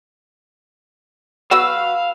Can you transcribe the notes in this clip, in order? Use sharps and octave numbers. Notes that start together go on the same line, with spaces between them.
F#3 B3 F#4 B4 F5 E6